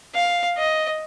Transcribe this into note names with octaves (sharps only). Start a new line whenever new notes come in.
F5
D#5